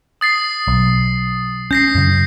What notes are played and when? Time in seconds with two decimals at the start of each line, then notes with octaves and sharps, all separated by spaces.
0.21 D#6 A6 C7
0.68 B1
1.71 C#4 G6 A#6 C7
1.95 F#2 C#3